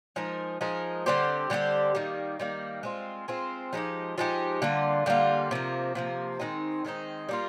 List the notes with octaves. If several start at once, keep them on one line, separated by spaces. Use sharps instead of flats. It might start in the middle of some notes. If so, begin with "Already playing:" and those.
F3 G#3 D#4 A#4
F3 G#3 D#4 A#4
D3 G3 C4 G4
D3 G3 C4 G4
D#3 G3 A#3
D#3 G3 A#3
G#3 C4 F4
G#3 C4 F4
F3 G#3 D#4 G4
F3 G#3 D#4 G4
D3 G3 A#3 F4
D3 G3 A#3 F4
C3 F3 A#3
C3 F3 A#3
D#3 G#3 C4 D#4
D#3 G#3 C4 D#4
G3 A#3 F4